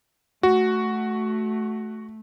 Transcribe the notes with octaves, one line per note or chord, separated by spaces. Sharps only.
A3 F#4